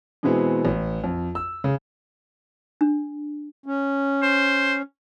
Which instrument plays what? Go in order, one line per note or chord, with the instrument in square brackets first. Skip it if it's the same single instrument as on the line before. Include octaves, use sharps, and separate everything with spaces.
[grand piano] B2 E3 G#3 B3 C4
A1
F2
E6
C#3
[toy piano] D4
[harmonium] C#4
[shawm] C5